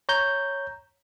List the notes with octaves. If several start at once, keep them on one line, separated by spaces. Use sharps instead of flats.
C#5 A#5 G6